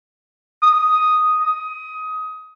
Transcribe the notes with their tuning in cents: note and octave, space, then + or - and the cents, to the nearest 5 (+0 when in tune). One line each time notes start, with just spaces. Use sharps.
D#6 +0
D#6 +20